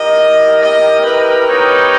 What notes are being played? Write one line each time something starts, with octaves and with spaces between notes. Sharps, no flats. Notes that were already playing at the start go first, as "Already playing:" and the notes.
Already playing: E4 G4 A#4 D#5
D#5
B4
B3 D#4 G4 A#4 C#5